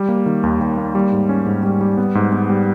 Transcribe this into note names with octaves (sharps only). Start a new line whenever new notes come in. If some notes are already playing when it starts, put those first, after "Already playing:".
Already playing: G3
A#3
D#3
D#2
D#2
A#3
G3
G#2
C#4
G#2
G3
G3
B3
G#2
B3
G3